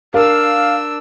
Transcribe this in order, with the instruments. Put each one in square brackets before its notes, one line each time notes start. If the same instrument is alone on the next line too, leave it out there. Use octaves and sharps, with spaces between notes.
[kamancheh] D4 E6 [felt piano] A#4 [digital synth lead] F5